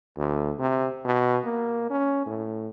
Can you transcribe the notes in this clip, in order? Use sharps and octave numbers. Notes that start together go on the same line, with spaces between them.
D2
C3
B2
A#3
C#4
A2